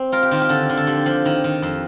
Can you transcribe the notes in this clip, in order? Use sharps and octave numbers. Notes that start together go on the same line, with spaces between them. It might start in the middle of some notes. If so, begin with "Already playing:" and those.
Already playing: C4
F4 A#4
G4
D#3 F4
G4
D3 A4
D3
A4
F3 G4
F3 G4
D#3
D#3
F2